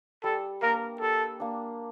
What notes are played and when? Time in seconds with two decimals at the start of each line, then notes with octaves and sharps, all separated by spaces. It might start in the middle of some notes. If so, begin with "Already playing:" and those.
0.24 G3 A4
0.62 A#3 D4 A#4
1.01 G3 A4
1.40 A#3 D4